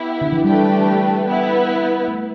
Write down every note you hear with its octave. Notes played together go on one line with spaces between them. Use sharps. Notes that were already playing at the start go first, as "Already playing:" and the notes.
Already playing: B3 E4 G4
D3
E3
G3 A3 D4 G4 B4 G5
B3 E4 B4
A3